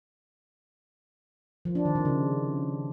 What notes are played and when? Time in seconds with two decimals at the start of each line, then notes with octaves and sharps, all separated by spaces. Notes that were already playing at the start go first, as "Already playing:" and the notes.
1.65 F3
1.75 D4
1.85 D#3
1.95 C3
2.05 C#3